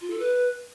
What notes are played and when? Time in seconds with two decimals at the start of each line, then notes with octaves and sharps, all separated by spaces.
0.01 F4
0.10 A4
0.20 B4